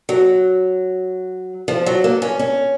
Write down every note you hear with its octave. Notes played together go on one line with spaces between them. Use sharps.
F#3
F3
F#3
A#3
C#4
C#4